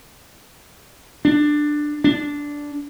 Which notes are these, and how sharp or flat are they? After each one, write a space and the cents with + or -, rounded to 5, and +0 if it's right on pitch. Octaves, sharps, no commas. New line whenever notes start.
D4 +10
D4 -10